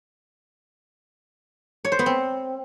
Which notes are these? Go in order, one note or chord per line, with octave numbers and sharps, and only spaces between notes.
C#5
C5
B3
C4